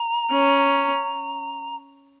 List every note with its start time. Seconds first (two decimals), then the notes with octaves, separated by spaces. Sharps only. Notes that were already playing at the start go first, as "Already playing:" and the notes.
Already playing: A#5
0.31 C#4